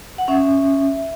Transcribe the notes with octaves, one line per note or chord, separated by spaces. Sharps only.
F#5
C#4 E5